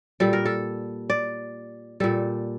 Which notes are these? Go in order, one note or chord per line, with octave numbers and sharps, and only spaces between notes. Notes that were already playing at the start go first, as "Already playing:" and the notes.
A#2 G3 A4
A#4
A4
D5
A#2 G3 A4